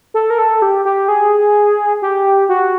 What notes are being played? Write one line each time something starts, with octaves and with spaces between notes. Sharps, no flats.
A4
A#4
A4
G4
G4
G#4
G4
F#4